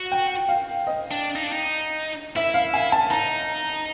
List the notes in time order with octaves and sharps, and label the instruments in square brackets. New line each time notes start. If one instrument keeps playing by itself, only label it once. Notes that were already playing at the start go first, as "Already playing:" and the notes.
Already playing: [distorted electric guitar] F#4
[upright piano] G5
F5
D#5
[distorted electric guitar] D4
D#4
D4
D#4
[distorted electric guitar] E4 [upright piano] E5
[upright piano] F5
G#5
A5
[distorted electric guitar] D#4 [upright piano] A#5